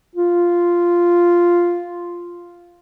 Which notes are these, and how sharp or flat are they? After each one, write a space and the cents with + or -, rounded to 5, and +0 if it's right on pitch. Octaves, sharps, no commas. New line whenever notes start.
F4 -5